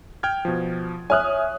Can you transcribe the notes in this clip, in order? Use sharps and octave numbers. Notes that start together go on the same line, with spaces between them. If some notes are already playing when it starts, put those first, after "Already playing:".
G5 F6 G#6
B2 F3
C#5 E5 G#5 D#6 F6 F#6